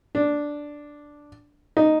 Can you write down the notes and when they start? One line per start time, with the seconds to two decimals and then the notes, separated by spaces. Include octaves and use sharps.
0.15 D4
1.77 D#4